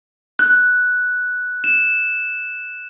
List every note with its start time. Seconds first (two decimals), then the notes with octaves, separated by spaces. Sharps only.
0.39 F#6
1.64 E7